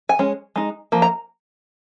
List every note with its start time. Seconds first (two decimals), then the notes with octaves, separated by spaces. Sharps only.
0.09 G#5
0.19 G#3 C#4
0.56 G#3 D#4
0.92 F3 A#3
1.02 A#5